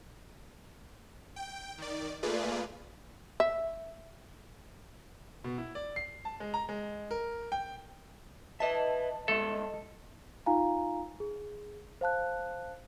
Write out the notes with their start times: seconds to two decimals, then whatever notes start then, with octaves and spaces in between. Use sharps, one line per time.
1.36 G5
1.78 D#3 D5
2.23 A3 A#3 F4 G#4 B4 D5
3.40 E5
5.44 B2
5.58 E4
5.75 D5
5.96 C7
6.25 A5
6.40 G#3
6.54 A#5
6.69 G#3
7.11 A#4
7.52 G5
8.60 B4 D#5 E5 A5
9.28 C2 G#3 A4 E5
10.46 D#4 F4 F5 G#5 A#5
11.20 G#4
12.01 C5 F5 A5 F#6